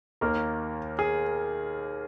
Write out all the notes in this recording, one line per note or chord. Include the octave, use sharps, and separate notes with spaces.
D#2 D#3 A#3 A#4
G#4